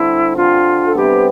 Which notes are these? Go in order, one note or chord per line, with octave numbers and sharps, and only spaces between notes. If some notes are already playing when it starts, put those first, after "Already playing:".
Already playing: D3 G3 C4 E4
D3 G3 C4 F4
A4
C3 G3 B3 G4